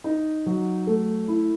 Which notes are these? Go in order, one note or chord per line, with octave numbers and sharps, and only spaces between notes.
D#4
F#3
A3
E4